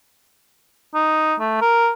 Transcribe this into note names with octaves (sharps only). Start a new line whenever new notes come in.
D#4
A3
A#4